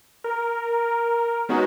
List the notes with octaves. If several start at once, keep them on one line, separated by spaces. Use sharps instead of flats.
A#4
G#3 B3 C#4 D#4 F#4